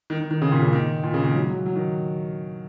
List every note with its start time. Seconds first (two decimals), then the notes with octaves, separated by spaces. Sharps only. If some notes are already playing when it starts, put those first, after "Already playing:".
0.10 D#3
0.20 D#3
0.31 D#3
0.42 C#3
0.51 A#2
0.62 C#3
0.73 D#3
1.03 A#2
1.14 C#3
1.24 D#3
1.34 F#3
1.50 F#3
1.66 F#3
1.76 D#3